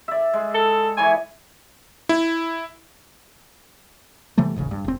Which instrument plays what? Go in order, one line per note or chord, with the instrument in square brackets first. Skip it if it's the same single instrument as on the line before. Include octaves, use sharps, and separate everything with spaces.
[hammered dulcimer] D5 E5
G#3
[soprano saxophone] A4
[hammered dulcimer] E3 C#5 D6 [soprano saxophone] G#5
[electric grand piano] E4
[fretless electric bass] C3 E3 G3 A3
D#1 A1 C#3
G2
E1 C4